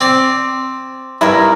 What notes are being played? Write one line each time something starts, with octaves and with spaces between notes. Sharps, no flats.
C4 D5
G2 E4 A#4